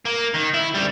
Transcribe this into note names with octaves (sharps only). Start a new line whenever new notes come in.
A#3
D#3
E4
D2 G3